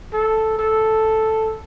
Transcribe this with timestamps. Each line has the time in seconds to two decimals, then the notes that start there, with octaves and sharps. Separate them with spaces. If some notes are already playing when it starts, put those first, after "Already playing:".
0.13 A4
0.59 A4